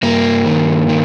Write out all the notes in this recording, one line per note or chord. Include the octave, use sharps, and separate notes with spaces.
G2 A#3
D#3
D#3